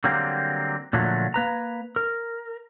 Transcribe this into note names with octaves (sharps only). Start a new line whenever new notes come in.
D3 F#3 G3 A#3 C4
A#2 D3 F3 F#3 A3
A#3 B4 A#5
A#4